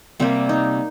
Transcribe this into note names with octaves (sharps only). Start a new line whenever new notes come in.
C3 G3 A#3 C4
D#4